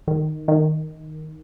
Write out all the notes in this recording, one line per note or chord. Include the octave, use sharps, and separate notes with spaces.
D#3
D#3